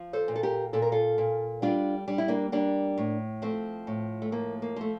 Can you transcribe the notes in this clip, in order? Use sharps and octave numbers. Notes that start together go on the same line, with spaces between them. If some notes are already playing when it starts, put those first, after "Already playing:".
Already playing: F3
A4 C5
A#2
A4
G4 A#4
A#2 A4
A#4
F4 A4
A#2
G3 D4 F4
G3 D4
E4
A#3 D4
G3 A#3 D4
A2
F3 A3 C4
A2
A3
F3 A#3
A#3
F3 A3